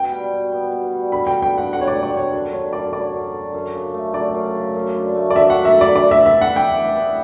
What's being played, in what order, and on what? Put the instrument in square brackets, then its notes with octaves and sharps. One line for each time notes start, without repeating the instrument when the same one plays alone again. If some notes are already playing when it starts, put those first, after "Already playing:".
Already playing: [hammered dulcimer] B2 [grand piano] G5
[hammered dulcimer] G3
B2
B3
B2
G3
[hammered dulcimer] G2 [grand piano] B5
[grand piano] G5
[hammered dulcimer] D3
[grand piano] G5
[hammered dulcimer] G2 [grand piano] F#5
[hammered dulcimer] F#3 [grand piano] F#5
[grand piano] C#5
D5
[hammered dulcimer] G2
[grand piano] D5
[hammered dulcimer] D3 [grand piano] C#5
[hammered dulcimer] F#2
[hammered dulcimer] D3 [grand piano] C#5
[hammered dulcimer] F#2 [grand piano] D5
[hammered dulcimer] F#3 [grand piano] D5
[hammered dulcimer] F#2
D3
F#2
C#3
A3
[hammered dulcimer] F#3 [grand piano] D5
[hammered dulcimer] F#2
C#3
F#2
D3
A3
[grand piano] D5
[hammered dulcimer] F#3 [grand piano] E5
[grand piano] F#5
[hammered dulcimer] F#2
[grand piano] E5
[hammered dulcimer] D3
[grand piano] D5
[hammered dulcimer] E3 [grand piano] D5
[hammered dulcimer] B3 [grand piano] E5
[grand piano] E5
[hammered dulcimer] E3
[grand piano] F#5
[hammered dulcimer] E4 [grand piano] G5
[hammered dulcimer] E3
B3